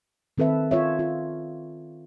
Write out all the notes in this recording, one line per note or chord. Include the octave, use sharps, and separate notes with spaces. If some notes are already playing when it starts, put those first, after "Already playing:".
D#3 C4 A4 B4 E5
F4 C#5 E5
F4